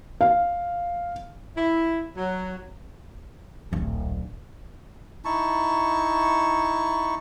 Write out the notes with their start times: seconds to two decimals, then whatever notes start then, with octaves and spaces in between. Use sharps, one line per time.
0.21 F5
1.57 E4
2.17 F#3
3.72 D1 A#1
5.25 D#4 E4 A5 C#6